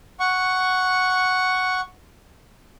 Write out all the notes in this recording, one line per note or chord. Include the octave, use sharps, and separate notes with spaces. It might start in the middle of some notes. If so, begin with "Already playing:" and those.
F#5 C#6